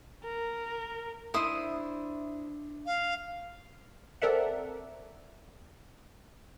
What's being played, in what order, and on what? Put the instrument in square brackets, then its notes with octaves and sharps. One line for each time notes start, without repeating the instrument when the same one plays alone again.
[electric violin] A#4
[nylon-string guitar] D4 E5 [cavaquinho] E4 C5 D#6
[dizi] F5
[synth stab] C4 A4 A#4 D5 E5 F#5